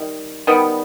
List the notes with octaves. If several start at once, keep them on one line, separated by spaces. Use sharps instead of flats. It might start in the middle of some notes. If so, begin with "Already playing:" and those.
Already playing: D#3 G3
D#3 G3 B3